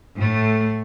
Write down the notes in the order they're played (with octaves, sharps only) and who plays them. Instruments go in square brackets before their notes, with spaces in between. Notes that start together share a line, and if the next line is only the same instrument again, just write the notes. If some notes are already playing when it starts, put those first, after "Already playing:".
[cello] A2 A3